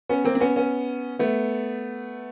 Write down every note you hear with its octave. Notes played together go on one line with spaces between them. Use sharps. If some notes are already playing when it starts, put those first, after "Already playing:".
B3 C#4
A#3 C4
C4
B3 C#4
B3 C#4
A3 B3